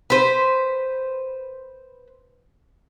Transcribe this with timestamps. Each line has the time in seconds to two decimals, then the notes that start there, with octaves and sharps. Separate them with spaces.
0.10 B4 C5